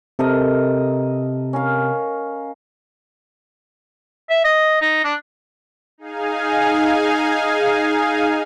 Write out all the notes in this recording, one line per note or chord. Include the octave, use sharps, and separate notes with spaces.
C3 A4 A#4 D#5
C#4 A#4 F5
E5
D#5
D#4
D4
D#4 G#4 F5 G#5